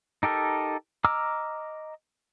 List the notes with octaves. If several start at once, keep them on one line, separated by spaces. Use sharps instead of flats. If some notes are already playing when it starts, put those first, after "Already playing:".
D#4 G4 A4 A#4
D#5 A#5 D6 E6 F6